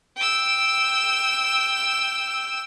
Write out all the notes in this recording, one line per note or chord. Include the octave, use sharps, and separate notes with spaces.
G5 E6